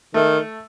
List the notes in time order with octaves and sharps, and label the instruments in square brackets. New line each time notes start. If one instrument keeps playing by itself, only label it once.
[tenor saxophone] D#3 [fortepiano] A3